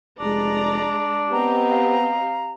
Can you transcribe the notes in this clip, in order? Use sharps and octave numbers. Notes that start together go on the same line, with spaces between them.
F1 G#3 D4 D5 A#5
B3 C4 G4 D#5 A#5
F5